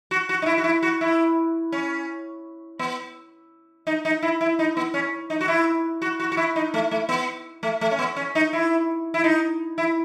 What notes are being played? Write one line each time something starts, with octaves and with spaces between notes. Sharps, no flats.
F#4
F#4
D#4
E4
F#4
E4
F#4
E4
C#4
B3
D#4
D#4
E4
E4
D#4
B3
C#4
D#4
F#4
E4
F#4
F#4
F#4
E4
D#4
A3
A3
B3
A3
A3
C#4
B3
C#4
D#4
E4
E4
D#4
E4